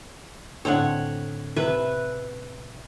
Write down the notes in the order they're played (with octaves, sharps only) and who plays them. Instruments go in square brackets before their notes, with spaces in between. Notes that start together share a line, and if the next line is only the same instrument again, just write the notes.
[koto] A2 D3 C4 [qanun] C#5 F#5
[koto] C3 [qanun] B4 E5